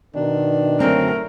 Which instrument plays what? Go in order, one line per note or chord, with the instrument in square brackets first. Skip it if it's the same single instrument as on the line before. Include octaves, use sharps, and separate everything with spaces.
[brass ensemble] B2 D#3 [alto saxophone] D4
[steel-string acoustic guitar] F#2 D3 C4 [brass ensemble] F#3 [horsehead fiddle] A3 A#4